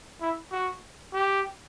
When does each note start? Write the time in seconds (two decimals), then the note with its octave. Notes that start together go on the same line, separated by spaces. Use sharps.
0.21 E4
0.51 F#4
1.13 G4